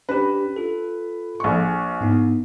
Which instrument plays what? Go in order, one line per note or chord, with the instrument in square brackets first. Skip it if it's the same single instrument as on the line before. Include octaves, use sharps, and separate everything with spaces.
[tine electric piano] C#4 D4 G4 [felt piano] B4
[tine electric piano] F4 A4
[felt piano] A#1 C#6
[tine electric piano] G#2 B3 D#4